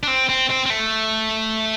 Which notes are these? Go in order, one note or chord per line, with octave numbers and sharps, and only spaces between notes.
D4
C4
C4
C4
C4
A3